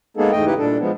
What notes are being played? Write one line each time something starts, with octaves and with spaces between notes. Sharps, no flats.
G#3 A#3 B3 D#4 G#4 A4
E2 G#2 A3 D#5 G5
C#3 D#4 E4 G4 B4
A#2 G3 D4 A4
F3 G#3 B3